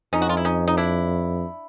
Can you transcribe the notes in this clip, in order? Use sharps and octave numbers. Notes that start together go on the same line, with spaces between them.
F2 C#4 D#4
F#4
F4
E4
C#4 D#4
D#4
D4 E4